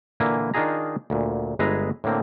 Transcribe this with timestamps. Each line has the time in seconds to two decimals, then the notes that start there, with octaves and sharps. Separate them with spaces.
0.20 A#2 D3 E3 A#3 E4 G#5
0.54 D#3 D4 D#4 F4 G#4 A#5
1.10 D2 A#2
1.59 G1 G#3 G#4 B4 E5 A#5
2.04 A2 D3 A#3 C4